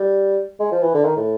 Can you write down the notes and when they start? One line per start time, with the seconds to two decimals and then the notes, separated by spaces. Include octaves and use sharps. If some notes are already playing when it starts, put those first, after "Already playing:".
Already playing: G3
0.60 G#3
0.72 F3
0.83 E3
0.94 D3
1.05 D#3
1.17 A2